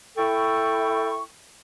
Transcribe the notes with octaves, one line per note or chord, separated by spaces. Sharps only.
E4 A4 G5 C#6